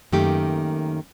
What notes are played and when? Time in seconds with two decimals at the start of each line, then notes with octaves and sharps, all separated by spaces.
0.12 F#2 D#3 A3 A#3 G4